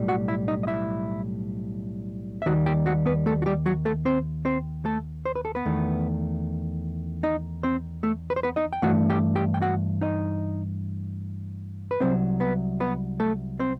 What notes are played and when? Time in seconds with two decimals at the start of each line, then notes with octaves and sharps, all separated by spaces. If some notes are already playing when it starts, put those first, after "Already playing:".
Already playing: B1 A2 G3
0.08 F#4 F#5
0.28 E4 E5
0.48 D#4 D#5
0.63 D#5
0.67 E4 E5
2.42 E5
2.46 D#2 D#3 G3 F#4 F#5
2.66 G4 G5
2.86 F#4 F#5
3.06 B3 B4
3.26 A3 A4
3.42 F#4
3.46 G3 G4
3.66 F#3 F#4
3.85 A3 A4
4.05 C4 C5
4.45 C4 C5
4.85 A3 A4
5.25 C5
5.35 B4
5.45 A4
5.55 B3 B4
5.65 E2 D#3 A3
7.23 D#4 D#5
7.63 C4 C5
8.03 A3 A4
8.30 B4
8.36 C5
8.43 B3 B4
8.56 D#4 D#5
8.73 G5
8.82 G2 E3 A3 F#4 F#5
9.10 G4 G5
9.35 G4 G5
9.54 G5
9.62 F#4 F#5
10.01 D#4 D#5
11.91 B4
12.00 C2 C3 F#3 C4 C5
12.40 B3 B4
12.80 B3 B4
13.20 A3 A4
13.60 C4 C5